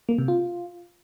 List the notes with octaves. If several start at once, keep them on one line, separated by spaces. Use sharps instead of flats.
A#3
C3
F4